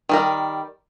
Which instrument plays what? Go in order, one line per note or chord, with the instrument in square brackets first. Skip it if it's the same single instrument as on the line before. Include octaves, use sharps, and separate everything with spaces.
[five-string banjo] D#3 G3 A#4